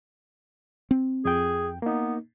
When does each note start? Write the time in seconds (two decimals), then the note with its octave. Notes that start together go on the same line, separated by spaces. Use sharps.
0.91 C4
1.25 F2 G#4 G5
1.82 A#3 B3 D#4